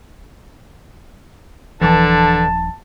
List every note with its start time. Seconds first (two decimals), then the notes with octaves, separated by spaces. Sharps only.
1.82 D#1 D3 E3 F3 D4 A5